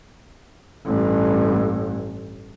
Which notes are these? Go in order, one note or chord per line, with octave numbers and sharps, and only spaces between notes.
A1 G2